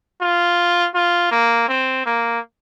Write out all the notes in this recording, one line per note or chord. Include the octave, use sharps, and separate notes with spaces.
F4
F4
A#3
C4
A#3